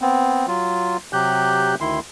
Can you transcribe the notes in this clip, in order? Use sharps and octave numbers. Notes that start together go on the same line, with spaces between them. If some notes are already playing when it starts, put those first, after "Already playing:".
B3 C4
F#3 F4
C3 F#3 G4 F#6 G6
D2 D#3 E4 C6